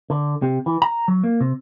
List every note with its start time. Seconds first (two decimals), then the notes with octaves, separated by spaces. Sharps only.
0.10 D3
0.42 C3
0.66 E3
0.82 A#5
1.08 F#3
1.24 A#3
1.40 C3